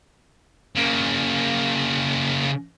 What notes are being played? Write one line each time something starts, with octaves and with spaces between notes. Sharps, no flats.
C#3 A#3